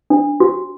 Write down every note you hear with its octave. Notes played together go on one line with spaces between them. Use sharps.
D4
F#4